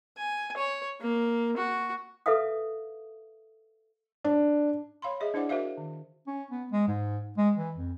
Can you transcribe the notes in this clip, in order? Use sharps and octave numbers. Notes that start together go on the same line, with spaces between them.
G#5
C#5
A#3
F#4
A4 B4 E5 F5 D#6
D4
C#5 F5 B5 C6
G#4 D#5 E5
D4 E4 C5 D5 F#5 D6
F#4 A#4 C5 E5 F5
D#3
C#4
B3
G#3
G#2
G#3
E3
F2